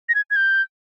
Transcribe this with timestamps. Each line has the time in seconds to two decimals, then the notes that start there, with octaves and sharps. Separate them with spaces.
0.09 A#6
0.15 G#6
0.30 G#6
0.36 G6